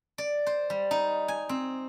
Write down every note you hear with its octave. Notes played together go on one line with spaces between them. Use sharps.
D5
C5
G3
D#4
G#5
C4